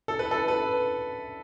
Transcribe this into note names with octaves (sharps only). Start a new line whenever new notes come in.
A4
B4
A4
B4